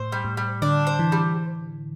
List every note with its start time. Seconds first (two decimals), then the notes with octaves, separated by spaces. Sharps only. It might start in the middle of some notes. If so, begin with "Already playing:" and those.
Already playing: A2 C5
0.12 G3
0.25 A2
0.37 G3
0.62 D3 D4
0.87 C5
0.99 E3
1.12 G3